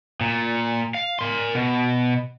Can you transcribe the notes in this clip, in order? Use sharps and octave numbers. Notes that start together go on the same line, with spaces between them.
A#2
F5
A#4 C6
B2